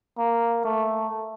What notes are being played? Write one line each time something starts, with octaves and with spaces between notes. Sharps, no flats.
A#3
A3